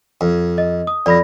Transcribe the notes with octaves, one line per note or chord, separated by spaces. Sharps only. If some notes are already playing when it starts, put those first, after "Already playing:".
F2
D#5
D#6
F2 D5 B5 A#6